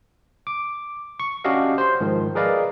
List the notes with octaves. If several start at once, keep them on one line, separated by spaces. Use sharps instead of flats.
D6
C#6
C#4 D4 F#4 G4 D#5 F5
C5 C6
G#2 D#3 F3
G#4 A#4 B4 D5 D#5 F5